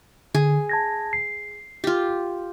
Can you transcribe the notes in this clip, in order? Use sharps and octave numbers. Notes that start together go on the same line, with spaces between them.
D3 G#4
A5 G#6 A#6
C7
F4 G4